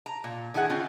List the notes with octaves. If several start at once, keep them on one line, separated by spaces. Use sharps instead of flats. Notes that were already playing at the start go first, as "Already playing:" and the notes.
A#5
A#2
D3 D#3 E4 G#4 A4 F#5
C4 C#4 F4